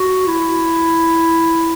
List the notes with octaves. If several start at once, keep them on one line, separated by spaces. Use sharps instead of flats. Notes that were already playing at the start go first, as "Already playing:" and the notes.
Already playing: F#4
E4